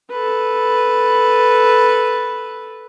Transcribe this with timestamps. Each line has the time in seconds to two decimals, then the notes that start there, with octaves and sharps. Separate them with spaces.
0.10 A4 B4